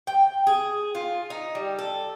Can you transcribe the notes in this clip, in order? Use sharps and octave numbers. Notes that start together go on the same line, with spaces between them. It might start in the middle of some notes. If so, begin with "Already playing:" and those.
G5
G#4
F4
D#4
G3
A4